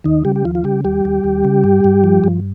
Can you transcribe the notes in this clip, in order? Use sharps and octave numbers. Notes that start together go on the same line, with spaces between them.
D#2 D#3 D#4
C#3 G3 G4
G4
D#2 F3 F4
F4
C#3 G3 G4
D#2 G3 G4
D#2
D#2
C#3
G2
G2
F3
G2